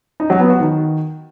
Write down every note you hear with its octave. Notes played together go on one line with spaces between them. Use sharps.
D#4
F#3
B3
F#4
D#3